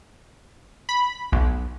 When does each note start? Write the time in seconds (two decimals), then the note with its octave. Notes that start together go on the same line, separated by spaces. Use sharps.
0.89 B5
1.32 B1